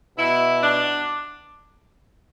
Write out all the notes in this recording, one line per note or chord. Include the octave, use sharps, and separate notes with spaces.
B2 E4
D4